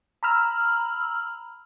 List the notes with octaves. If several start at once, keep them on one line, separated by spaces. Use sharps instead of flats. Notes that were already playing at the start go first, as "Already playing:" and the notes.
A#5 B5 E6 F6